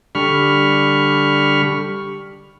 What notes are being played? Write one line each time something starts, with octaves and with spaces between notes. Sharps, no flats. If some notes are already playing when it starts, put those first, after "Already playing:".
D3 G3 B5 C#6 F6